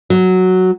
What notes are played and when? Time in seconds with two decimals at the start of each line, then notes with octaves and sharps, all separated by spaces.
0.10 F#3